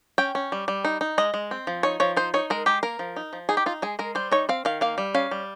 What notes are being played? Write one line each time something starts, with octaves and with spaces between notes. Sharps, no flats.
C#4 G5
C#4
G3
G3
D#4
D#4
G#3 D#5
G#3
C4
F3
D#4 C#5
F3 C#5
D#4 C5
D#4 C#5
G#3 A#4
G#3 G4
A#3 A#4
F3
D#4
F3
D#4 G#4
G4
D#4 F4
G#3 G#4
G#3 A#4
G3 C5
D#4 C#5
C4 F5
D#3 F5
A#3 F5
G3
C#4 F5
G3